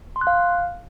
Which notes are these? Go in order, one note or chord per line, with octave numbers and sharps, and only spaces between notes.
C6
F#6
F5